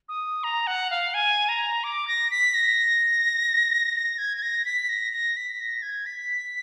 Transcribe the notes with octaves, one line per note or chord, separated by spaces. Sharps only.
D#6
A#5
F#5
F5
G#5
A#5
D6
A#6
B6
A#6
A#6
G#6
G#6
A#6
B6
A#6
A#6
B6
A#6
G#6
B6